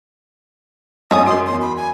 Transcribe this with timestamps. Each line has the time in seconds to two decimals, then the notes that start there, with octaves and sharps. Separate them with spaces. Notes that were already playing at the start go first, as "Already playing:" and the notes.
1.11 F#2 D#4 C#5 D#5 G#5 D#6
1.26 F#4 A#4 C6
1.47 E2 C6
1.62 B5
1.77 G#5